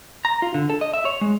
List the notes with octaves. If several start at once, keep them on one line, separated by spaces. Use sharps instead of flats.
A#5
F4
D3
A4
D#5
E5
C#5
G#3